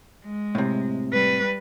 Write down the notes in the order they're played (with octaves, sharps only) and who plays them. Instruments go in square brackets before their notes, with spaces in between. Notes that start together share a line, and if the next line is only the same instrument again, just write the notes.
[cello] G#3
[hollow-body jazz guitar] A2 C3
[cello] G3 B4